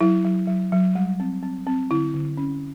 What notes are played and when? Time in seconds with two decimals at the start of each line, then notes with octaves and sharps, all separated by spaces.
0.01 F#3 E4
0.25 F#3
0.48 F#3
0.72 F#3
0.95 G3
1.20 C4
1.43 C4
1.67 C4
1.91 D3 E4
2.14 D3
2.37 C#4